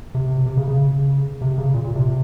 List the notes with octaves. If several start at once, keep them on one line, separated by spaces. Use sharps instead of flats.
C3
C3
C#3
C#3
C3
C#3
A#2
A#2
C3